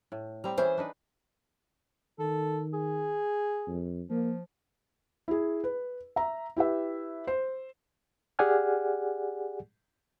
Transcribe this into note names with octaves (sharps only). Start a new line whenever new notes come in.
A2
G3 C4 G4 A#5
E3 C#4 G#4 C5 E5
D4 D#4 B4
D#3 A4
G#4
F2
F3 A#3
E4 G#4
B4
E5 A#5
E4 G4 B4 E5
C5
G4 G#4 D5 F#5 G#5 F6